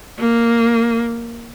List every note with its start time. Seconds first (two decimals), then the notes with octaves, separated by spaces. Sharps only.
0.18 A#3